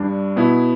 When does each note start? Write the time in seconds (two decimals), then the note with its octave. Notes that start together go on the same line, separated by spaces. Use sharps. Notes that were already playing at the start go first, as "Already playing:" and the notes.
Already playing: G2 G3 D4
0.36 B2 B3 E4